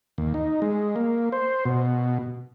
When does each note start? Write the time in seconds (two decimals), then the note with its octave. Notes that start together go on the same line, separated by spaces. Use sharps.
0.18 D#2
0.34 D#4
0.62 G#3
0.96 A#3
1.32 C5
1.65 B2